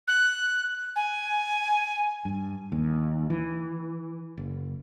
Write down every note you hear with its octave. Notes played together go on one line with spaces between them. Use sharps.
F#6
G#5
G2
D#2
E3
F#1